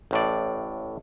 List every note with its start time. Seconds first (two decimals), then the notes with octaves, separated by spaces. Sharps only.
0.11 A1 A2 D5